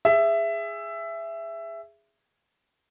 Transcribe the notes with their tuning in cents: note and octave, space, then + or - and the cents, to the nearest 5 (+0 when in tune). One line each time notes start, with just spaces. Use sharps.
G#4 -10 E5 +15